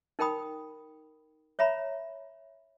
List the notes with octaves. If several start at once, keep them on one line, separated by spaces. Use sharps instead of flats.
D#4 A#4 G5 B5 D#6
C#5 E5 A#5 B5